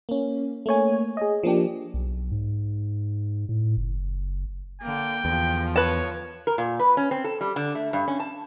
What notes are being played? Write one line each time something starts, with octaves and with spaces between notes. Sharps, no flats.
A#3 C#4
A3 A#3 C#5 G#5
G#4 D#5
F3 A#3 D4 G4
B1
G#2
A2
F#1
D3 A#3 G5
E2 D3 F3
B4 C#5 A5
A#4
A#2
B4
C#4
C4
A4
G3
D3
A3
G2
C#4
A5